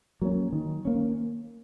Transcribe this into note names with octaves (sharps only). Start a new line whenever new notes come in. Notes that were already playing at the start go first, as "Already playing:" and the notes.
F#3 A#3 C#4
D#3
A#3 C#4